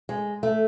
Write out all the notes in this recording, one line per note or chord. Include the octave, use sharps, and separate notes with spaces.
G#3
A3